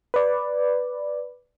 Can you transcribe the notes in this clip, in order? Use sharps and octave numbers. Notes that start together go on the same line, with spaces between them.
B4 D5